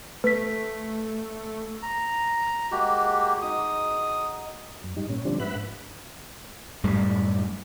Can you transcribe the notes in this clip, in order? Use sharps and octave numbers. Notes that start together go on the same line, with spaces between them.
A3 B4 B6
A#5
G#3 A#3 F#4 G4
D#4 F#4 G#4 D#6
F#2
G#2 G3 D#4
A#2 C#4
D3 F3 G3 C4 D4
G#2 B4 E5 F#5 B5 F#6
F#2 A2 G3